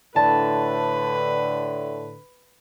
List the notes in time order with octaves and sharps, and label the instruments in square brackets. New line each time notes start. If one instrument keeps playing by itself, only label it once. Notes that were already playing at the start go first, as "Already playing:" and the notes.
[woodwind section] A2 D3 [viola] B4 [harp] A5